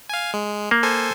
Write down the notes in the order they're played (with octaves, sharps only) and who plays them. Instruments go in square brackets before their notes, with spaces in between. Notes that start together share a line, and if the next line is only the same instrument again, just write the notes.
[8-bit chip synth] F5 G#5
G#3
[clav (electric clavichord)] A#3
[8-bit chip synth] A4 C5 G#5